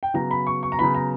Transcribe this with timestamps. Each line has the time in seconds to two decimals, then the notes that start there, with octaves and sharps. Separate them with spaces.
0.03 G5
0.14 C#3 F#3 B3 A#5
0.31 B5
0.47 C#6
0.63 C#6
0.72 A#5
0.79 C#3 F#3 B3 B5
0.95 A#5